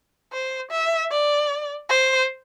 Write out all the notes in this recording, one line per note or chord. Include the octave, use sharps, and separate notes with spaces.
C5
E5
D5
C5